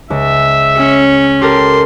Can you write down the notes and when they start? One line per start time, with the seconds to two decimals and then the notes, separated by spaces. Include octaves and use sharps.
0.10 C#2 E5
0.77 C#4
1.42 G4 A4 A#4 C6